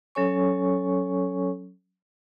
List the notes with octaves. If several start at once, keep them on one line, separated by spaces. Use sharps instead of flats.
F#3 C#4 A4 C#5 G#5 C#6